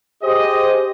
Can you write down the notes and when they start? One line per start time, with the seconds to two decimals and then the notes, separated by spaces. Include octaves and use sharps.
0.22 G4 G#4 C5 D#5